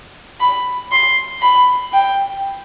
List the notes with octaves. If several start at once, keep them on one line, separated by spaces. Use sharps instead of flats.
B5
C6
B5
G5